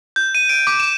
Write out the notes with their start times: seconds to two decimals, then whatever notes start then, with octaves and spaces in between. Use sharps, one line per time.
0.16 G6
0.35 D#7
0.49 D7
0.67 D6
0.80 E7